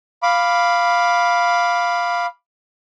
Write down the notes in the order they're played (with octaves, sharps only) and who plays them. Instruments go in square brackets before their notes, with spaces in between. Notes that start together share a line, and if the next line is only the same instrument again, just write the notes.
[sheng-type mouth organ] F5 B5 D6